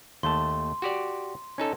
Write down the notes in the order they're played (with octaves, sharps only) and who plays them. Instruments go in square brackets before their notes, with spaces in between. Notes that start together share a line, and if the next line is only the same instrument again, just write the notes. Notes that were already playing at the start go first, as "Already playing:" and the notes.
[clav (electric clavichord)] D#2 A3 A5 [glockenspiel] C6
[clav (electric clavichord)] F#4 G4 D5
C#4 D#4 A4